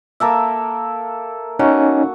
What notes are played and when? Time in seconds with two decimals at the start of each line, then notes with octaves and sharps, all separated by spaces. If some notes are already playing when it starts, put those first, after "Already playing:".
0.20 A#3 A4 E5
1.59 C#4 D#4 F#4